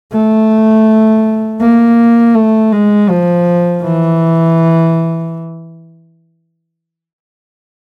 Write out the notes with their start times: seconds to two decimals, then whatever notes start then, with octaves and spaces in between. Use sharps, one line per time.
0.13 A3
1.61 A#3
2.35 A3
2.72 G#3
3.09 F3
3.82 E3